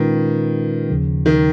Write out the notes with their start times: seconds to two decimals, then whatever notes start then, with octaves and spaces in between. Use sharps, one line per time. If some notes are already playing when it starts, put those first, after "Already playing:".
Already playing: A#2 D#3 G#3 C#4 F4 B4
0.89 D#2 C#3 F3
1.26 D#3